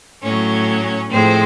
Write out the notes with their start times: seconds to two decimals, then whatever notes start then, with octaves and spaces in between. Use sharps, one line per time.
0.22 A2 F#3 C#4 C#5
1.10 A2 F3 G#3 C4 C5